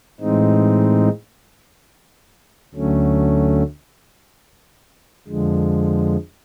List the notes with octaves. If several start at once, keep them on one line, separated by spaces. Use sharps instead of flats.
A2 E3 G#3 C4 D#4
D2 D3 F#3 A3 C#4
F2 D3 F3 G#3